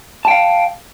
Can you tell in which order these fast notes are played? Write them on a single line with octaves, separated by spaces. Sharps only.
A5 G5 F5